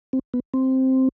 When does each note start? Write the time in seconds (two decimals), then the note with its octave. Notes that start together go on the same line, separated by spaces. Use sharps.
0.13 C4
0.34 B3
0.54 C4